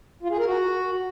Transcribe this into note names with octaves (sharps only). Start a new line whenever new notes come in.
F4
G#4
A#4
F#4